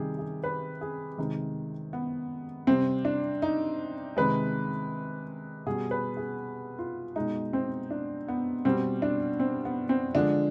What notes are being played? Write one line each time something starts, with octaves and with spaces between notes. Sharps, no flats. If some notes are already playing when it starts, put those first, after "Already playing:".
Already playing: C3 D#3 G3 G4 G#4
G#4
B4
G#4
C3 D#3 G#3
B3
C3 G3 C4
D4
D#4
C3 D#3 G#3 B4
B2 G3 G#4
B4
G#4
F4
B2 G#3 D#4
C4
D4
B3
B2 G3 C4
D4
C4
B3
C4
D3 F3 G#3 D4